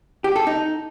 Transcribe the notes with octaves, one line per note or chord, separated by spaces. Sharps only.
G4
A4
D#4